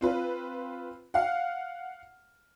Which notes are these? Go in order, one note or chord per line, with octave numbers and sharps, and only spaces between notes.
C4 F4 B4
F5 F#5